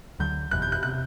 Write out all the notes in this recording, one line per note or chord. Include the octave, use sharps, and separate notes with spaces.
D2 D3 F#3 G6
F#1 E2 B2 F#6
G6
F#6
C3 F#6